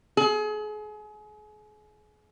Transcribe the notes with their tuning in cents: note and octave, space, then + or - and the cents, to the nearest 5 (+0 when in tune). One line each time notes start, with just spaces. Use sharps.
G#4 +35